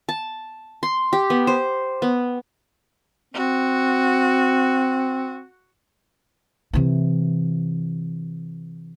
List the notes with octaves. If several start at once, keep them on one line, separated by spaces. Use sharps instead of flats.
A5
C6
G4
B3
C5
B3
C4 F#4
C3 E3